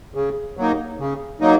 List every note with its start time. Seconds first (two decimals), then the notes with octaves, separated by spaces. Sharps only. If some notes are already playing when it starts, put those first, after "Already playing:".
0.15 C#3
0.57 F#3 A#3 D#4
0.99 C#3
1.40 F#3 A#3 D#4